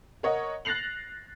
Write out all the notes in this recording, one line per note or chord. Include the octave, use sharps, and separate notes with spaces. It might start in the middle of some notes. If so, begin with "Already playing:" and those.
A#4 C#5 D#5 F#5
F#6 A6 A#6 C7 F7 F#7